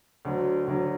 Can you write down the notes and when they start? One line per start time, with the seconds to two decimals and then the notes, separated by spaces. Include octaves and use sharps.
0.25 D2 D3 F#3
0.68 D2 D3 F#3